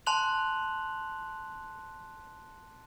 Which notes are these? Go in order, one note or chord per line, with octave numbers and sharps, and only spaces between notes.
G#5 A5 C6 F#6 F7 F#7